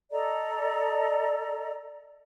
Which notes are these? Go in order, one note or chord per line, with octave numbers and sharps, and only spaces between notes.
A4 D5 D#5 A#5